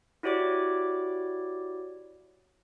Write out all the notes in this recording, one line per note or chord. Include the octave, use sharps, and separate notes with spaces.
E4 F#4 G4 C#5 D5 D6